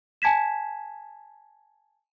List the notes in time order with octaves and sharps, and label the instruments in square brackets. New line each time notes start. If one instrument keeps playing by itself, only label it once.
[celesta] G#5 A5 G#6 B6 E7